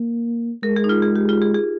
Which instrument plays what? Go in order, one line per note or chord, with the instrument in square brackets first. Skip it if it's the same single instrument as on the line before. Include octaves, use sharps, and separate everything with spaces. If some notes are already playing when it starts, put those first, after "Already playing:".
Already playing: [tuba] A#3
[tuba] G#3 [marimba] A#4
[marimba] G#4
D#4
F4
G#4
G4
F4
G#4
G#4